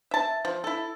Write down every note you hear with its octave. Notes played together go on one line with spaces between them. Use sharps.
E5 A5
F3
E4 A4